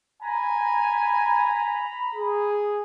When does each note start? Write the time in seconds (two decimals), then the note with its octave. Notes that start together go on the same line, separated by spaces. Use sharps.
0.22 G#5 A#5 B5
2.15 G#4